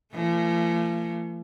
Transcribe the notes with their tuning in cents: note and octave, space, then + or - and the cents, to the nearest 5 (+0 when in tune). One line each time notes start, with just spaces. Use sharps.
F3 -45 A3 +40